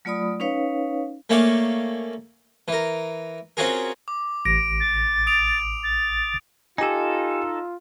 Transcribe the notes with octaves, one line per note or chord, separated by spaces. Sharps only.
F#3 A3 F4 D5 B5 D#6
C#4 D#4 B4 C#5 F5
A3 A#3 C#4 C#5 D5 F5
E3 A#4
C4 C#4 F4 F#4 G#4 A#4
D6
A1 A#6 D7
A6
D#6 D7 F7
A6
D#4 F4 G4 A4 G#5